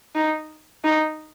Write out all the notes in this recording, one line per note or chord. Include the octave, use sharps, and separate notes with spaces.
D#4
D#4